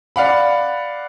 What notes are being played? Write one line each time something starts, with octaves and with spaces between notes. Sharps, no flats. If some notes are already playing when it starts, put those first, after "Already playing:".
D5 F5 F#5 B5